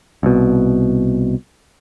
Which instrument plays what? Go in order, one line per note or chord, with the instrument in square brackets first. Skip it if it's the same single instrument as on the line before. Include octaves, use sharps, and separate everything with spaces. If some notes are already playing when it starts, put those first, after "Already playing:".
[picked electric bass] C2 B2